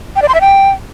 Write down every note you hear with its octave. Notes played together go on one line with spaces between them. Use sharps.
G5
D5
C6
E5
G5